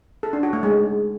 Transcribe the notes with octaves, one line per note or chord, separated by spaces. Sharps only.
A4
D4
F#4
A3
G#3